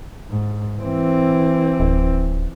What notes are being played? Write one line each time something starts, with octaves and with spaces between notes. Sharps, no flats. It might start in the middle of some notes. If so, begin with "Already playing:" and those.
G#2
E3 C4
D1